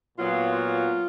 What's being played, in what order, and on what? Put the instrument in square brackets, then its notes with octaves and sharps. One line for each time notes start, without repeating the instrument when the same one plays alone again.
[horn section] A#2 F#3 B3 F4
F4